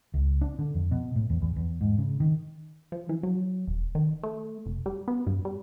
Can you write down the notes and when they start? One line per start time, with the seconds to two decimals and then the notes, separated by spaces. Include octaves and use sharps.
0.14 C#2
0.41 D4
0.59 D3
0.75 F2
0.91 B2
1.15 A2
1.30 E2
1.42 E2
1.56 E2
1.81 G#2
1.98 C#3
2.20 D#3
2.92 F3
3.09 E3
3.23 F#3
3.67 E1
3.95 D#3
4.23 A3
4.66 F1
4.86 G3
5.08 B3
5.27 G2
5.45 G3